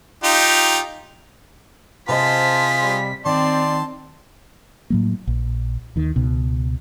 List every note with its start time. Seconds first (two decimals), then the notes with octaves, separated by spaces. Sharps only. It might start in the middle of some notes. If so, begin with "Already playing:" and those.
0.24 D#4 F4 G4
2.09 C3 F4 G#4 C5 D#5 A5 B6
2.82 G3
3.26 D#3 C4 D5 A5 C6
4.90 A2 F#3 A#3
5.27 A#1
5.96 D#2 D#3
6.16 C#2 B2